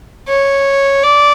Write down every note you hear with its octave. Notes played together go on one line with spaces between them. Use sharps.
C#5
D5